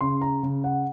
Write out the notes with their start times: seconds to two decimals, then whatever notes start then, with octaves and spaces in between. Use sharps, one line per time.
0.01 C#3 C6
0.22 A#5
0.43 C#3
0.64 F#5